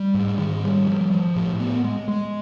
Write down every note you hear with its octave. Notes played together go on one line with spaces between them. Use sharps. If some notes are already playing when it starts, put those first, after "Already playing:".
Already playing: G3
G#2
D#3
G3
F3
F3
A2
B3
G#3
G#3